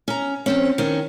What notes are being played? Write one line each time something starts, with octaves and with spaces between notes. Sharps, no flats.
C#4 A#5
F2 C4 C#4
D#3 C#4